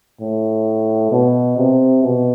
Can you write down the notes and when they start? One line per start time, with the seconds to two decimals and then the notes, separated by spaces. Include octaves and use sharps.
0.21 A2
1.11 B2
1.57 C3
2.03 B2